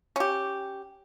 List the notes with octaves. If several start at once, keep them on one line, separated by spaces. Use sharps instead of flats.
C#4 G4